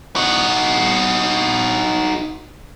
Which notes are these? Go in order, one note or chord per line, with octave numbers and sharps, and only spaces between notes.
D#4 F#4